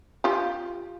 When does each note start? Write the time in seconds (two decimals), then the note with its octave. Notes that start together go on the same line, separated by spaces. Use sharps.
0.24 F4 G4